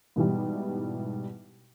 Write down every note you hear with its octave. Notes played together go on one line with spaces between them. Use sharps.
G#2 B2 E3 G3